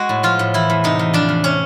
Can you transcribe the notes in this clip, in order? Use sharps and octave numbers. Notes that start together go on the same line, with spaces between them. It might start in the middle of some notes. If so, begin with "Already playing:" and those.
Already playing: G#3 F#4
A2
F3 F4
A2
E3 E4
E2
C3 D#4
E2
F3 D4
E2
C3 C#4